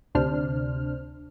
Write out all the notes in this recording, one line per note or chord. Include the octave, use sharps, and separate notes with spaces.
D2 C3 D4 C5 F6